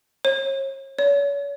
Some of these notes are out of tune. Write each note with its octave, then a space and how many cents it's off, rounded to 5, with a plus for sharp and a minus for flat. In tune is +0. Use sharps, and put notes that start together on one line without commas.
C#5 -40
C#5 +35